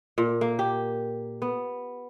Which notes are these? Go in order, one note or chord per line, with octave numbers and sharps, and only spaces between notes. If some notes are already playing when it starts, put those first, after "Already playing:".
A#2
A#3
G4
B3